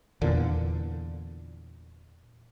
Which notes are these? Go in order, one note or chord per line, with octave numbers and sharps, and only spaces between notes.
E2 A#2 D3